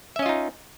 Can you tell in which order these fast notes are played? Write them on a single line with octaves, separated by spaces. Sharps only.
E5 C#4 D#5 F4 D#4